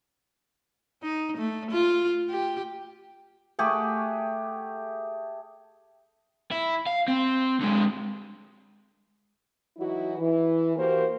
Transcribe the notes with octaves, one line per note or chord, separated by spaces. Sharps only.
D#4
A3
F4
G4
A3 G4 G#4 F#5
E4
F5
C4
D3 G#3
E3 F#3 D#4 E4 F#4
E3
A#3 F#4 G4 A#4 C5